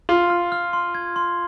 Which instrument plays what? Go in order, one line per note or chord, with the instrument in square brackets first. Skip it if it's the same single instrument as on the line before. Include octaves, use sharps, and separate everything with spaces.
[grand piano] F4 [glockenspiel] C6
[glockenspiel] F6
F6
C6
G#6
C6